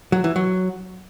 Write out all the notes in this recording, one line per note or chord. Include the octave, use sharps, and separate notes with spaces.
F#3
E3
F#3